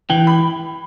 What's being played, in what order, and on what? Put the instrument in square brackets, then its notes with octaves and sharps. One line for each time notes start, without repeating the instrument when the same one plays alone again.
[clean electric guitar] E3 [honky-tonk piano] G5
[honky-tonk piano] B5